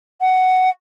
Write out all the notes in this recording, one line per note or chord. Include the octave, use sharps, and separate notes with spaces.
F#5